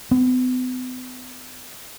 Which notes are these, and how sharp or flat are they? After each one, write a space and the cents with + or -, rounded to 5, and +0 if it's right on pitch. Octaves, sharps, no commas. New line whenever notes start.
B3 +45